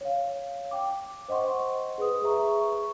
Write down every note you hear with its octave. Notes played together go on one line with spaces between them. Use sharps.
C#5 F5
G5 D6
C5 D#5 F#5 C6 C#6
G#4 B4 D#6
G#4 B4 E5 A#5 C#6
C#6